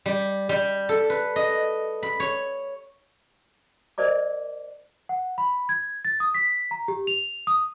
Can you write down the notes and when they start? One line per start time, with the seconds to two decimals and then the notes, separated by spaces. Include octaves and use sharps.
0.06 G3
0.49 G3
0.89 A4
1.10 B4
1.36 D#5
2.03 B5
2.20 C#5
3.98 A#4 C5 D5 D#5 D6
5.09 F#5
5.38 B5
5.69 G#6
6.05 A6
6.20 D#6
6.35 B6
6.71 A#5
6.88 G4
7.07 F7
7.47 D#6